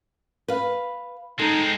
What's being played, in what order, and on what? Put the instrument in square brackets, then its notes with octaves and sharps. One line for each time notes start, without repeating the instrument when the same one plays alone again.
[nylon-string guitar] B4 F5
[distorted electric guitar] G#3 C4 [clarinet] D#4 [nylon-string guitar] A4